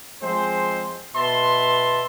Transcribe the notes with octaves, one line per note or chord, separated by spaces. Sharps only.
F3 G#3 C4 C5
B2 B4 E5 A5 C6